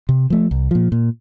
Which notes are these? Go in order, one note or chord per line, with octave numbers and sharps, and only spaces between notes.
C3
F3 A3
C2
A#2 F3
A#2